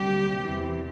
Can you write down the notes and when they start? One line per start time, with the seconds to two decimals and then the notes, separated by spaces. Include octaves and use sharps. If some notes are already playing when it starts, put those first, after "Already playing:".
Already playing: D2 C3 G3 A#3 G4
0.44 E2 C3 E3